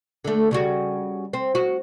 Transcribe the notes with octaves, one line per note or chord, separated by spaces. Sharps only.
D3 A3
C#3 G3 F#4
C4
F#4